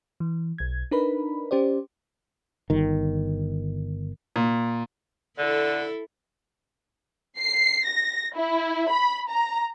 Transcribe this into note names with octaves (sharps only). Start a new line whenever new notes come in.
E3
B1 G#6
D4 D#4 A#4 B4 B5
C#4 G4 C5 D5
G1 D#3
A#2
D3 E4 A4
C7
A#6
E4
B5
A#5